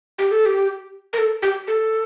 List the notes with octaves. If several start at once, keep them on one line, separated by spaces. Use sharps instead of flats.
G4
A4
G4
A#4
A4
G4
A4